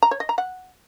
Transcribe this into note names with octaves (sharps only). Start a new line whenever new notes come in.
A#5
C#5
D#5
A#5
F#5